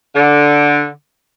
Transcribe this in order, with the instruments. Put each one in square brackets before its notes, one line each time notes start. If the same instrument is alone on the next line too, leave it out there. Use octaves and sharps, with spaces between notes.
[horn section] D3